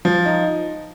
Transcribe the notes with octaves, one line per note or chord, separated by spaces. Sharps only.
F3
D#4